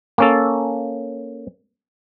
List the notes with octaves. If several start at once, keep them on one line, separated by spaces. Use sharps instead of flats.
A#3 C#4 A4